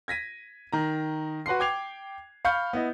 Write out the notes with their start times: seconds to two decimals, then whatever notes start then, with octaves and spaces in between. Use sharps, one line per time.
0.08 G#6 A#6 B6 D#7
0.73 D#3 A#5
1.46 F#4 B4 F#5 C6 C7
1.60 G5 D6 G#6 C7 F7
2.45 F5 B5 C#6 F6 G6 C#7
2.73 B3 E4 D#5